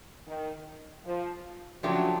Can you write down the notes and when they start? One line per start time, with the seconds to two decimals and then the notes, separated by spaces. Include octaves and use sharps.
0.28 D#3
1.06 F3
1.83 C#3 F3 F#3 A3 D4 G4